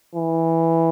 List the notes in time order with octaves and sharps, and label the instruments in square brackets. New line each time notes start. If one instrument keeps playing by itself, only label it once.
[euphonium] E3